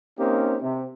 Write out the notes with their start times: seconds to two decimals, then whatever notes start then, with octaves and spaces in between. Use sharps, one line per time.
0.18 A#3 C4 C#4 D#4 G4
0.62 C3